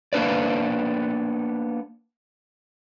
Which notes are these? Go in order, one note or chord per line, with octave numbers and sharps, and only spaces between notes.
A#3 B3 D4 B4 D5